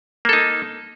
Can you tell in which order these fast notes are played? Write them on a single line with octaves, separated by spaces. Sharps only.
A#3 A4 D#4